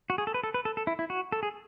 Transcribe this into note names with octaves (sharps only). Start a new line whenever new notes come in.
F#4
G#4
A4
B4
A4
B4
A4
A4
E4
E4
F#4
A4
G#4